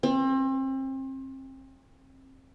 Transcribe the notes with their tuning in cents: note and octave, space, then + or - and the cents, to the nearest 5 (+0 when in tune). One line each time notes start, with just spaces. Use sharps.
C4 +35